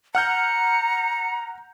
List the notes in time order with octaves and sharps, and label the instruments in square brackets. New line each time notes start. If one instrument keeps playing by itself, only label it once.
[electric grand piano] F#5 F6 G6 [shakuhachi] A#5 [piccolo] C#7